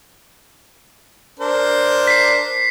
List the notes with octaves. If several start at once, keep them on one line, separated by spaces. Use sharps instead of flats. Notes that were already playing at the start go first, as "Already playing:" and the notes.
D4 A#4 C5
B6 C7